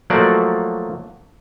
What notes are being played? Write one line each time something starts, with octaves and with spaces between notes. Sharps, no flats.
F3 F#3 A3 A#3 F#4 D5